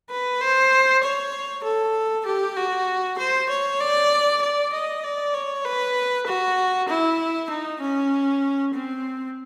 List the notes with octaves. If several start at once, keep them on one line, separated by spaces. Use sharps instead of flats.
B4
C5
C#5
A4
G4
F#4
C5
C#5
D5
D5
D#5
D5
C#5
B4
F#4
E4
D#4
C#4
C4